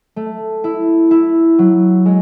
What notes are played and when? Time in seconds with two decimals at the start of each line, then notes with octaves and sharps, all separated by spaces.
0.16 A3
0.64 E4
1.11 E4
1.59 F#3
2.06 G#3